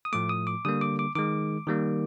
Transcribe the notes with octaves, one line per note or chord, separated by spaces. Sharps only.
D#6
A2 F3 A3 D6
D#6
D6
D3 G3 A#3 D#6
D6
D6
D#3 G#3 D6
D#3 G3 A#3